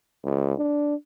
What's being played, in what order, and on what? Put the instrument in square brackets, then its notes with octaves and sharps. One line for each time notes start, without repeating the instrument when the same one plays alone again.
[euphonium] C#2
D4